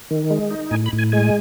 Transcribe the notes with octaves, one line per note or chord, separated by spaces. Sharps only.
D#3
G#3
D#4
A2 G#5
B5
A2
G#5
G#3 G#5